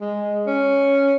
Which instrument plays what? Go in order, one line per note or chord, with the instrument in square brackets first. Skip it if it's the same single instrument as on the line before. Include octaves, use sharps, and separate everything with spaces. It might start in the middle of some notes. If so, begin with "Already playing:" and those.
[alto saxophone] G#3
C#4